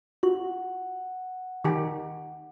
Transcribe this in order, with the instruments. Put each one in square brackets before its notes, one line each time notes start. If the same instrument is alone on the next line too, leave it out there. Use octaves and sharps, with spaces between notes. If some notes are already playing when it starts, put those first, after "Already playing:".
[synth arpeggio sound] F4 F#4 [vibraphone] F#5
[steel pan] D#3 G4